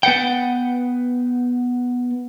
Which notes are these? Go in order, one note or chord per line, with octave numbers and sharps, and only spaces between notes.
B3 B4 F#5 G5